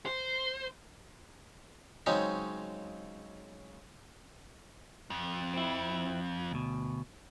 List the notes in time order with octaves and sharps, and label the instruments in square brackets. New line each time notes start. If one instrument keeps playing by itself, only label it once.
[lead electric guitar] C5
[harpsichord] C#3 F#3 G#3 C4 C#4 D#4
[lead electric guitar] F2
[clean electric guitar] C4 E4
D2 B2